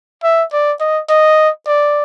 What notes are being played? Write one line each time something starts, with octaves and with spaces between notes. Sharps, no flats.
E5
D5
D#5
D#5
D5